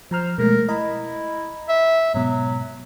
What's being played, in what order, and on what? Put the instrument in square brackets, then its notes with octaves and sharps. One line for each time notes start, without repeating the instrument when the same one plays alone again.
[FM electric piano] F3 A#5 F6 [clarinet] C5
[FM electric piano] B2 G#3 A3 [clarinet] A#4
[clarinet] E4 [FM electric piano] D#5 A#5 B5
[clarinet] E5
[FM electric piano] G#2 B2 [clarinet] F#3